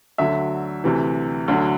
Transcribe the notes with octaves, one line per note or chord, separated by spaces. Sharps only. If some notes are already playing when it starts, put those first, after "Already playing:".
D2 D3 F#3 E5
D2 C3 E3
D2 D3 F#3